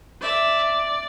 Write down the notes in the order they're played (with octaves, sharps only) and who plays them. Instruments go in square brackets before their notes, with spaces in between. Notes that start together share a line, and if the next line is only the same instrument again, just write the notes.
[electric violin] D5 [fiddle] E5